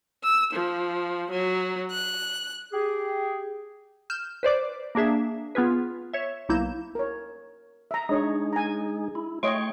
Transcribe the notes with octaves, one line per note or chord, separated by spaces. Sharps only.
E6
F3
F#3
F#6
G4 G#4
F6 G6 E7
B4 C5 D5 D6
A#3 D4 G#4 E5
B3 F4 G#4 B4
C#5 E5
B1 A#3 E4 G6 E7
A#4 C#5
E5 A#5
G#3 D4 D#4 G#4 C#5 C#6
G#5 A#5
E4
A3 C#5 D#5 G5 C6 C#6